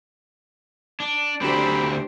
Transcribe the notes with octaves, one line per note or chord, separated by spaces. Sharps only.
D4
D2 F#3 C4 D4 G4 C5 A#5 B5